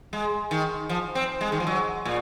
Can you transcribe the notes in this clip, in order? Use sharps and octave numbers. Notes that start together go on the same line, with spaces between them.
G#3
D#3
F3
C4
G#3
D#3
F3
F#3
A#2